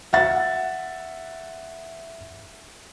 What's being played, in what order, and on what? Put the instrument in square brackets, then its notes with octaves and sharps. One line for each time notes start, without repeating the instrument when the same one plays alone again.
[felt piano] E5 F#5 A6